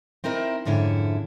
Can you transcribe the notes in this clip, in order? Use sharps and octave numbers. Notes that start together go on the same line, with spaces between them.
C4 D#4 E4 A#4
F2 G#2 D3 C#4 E4